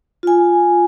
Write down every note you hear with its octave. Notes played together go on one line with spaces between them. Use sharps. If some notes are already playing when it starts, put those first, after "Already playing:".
F4 G#5